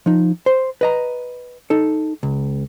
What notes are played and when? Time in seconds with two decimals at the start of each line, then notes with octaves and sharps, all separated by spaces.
0.06 F3 D#4
0.46 C5
0.81 B4 D#5 A#5
1.70 D#4 A4
2.23 C#2